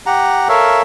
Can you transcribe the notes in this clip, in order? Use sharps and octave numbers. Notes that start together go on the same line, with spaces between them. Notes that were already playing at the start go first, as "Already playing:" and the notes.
G4 F#5 A#5
A4 A#4 C#5 E5 F5